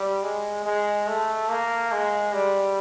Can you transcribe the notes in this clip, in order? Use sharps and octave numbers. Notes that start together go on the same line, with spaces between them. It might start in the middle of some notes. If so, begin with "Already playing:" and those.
Already playing: G3
G#3
G#3
A3
A#3
G#3
G3